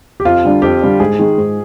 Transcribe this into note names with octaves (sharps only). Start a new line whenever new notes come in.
G4
F2 F4
D3 G3 D4
F2 G4
D3 G3 D4
G#2 G#4
D#3 G#3
G#2